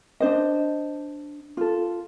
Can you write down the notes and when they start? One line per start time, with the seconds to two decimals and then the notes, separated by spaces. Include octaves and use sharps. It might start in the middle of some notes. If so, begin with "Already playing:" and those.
0.20 D4 C5 D#5
1.57 F4 A4